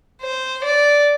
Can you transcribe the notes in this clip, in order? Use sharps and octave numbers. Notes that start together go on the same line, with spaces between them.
C5
D5